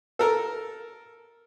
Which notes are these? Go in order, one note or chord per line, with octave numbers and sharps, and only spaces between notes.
A4 A#4